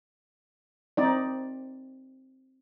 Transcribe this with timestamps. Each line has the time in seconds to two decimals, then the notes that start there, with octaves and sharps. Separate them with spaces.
0.97 C4 D#4 D5